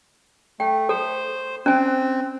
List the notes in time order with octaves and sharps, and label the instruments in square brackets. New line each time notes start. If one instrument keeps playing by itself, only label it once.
[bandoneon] A3 [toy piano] G5
[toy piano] A4 [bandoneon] C5
[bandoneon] C4 [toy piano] C#4 G#5